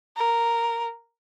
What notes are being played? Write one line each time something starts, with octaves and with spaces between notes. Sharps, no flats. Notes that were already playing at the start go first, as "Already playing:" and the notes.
A#4